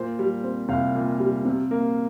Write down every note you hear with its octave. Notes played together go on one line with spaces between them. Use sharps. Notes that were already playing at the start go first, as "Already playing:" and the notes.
Already playing: A#2 C5
G3
C4
C2 F5
A#2
G3
C3
A#3